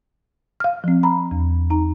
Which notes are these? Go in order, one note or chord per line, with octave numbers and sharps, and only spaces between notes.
F5 F6
F3 C4
A#5 B5
E2
D#4 A#5